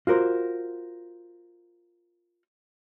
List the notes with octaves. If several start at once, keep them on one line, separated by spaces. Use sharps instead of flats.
F4 F#4 A#4 C5